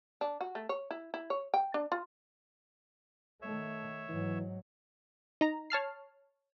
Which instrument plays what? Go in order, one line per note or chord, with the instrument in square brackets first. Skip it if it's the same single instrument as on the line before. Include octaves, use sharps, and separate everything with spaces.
[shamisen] D4
F#4
A3
C#5
E4
E4
C#5
G5
D4
F4
[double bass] D#3 A3 [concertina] C#5 E5
[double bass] G#2 F#3 [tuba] E3
[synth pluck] D#4 A#5
C#5 A5 F6 C7